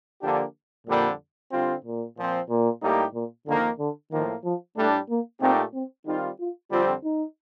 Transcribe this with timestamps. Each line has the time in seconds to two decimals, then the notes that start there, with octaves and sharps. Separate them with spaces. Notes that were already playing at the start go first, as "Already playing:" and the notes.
0.22 D3 F3 A#3 D4 G4
0.87 F2 A#2 D3 G3
1.52 D3 G3 C4 F4
1.85 A#2
2.17 A#2 F3 C4
2.49 A#2
2.82 A2 G3 A#3 D#4 G4
3.14 A#2
3.47 F2 D3 D#3 A#3 D#4
3.79 D3
4.11 A2 D#3 F3 A#3
4.44 F3
4.76 A2 G3 A3 D4
5.09 A#3
5.41 A#2 A3 C4 D#4 G4
5.74 C4
6.06 D#3 G3 C4 D#4 F4
6.39 F4
6.71 F2 D3 G3 C4 F4
7.04 D#4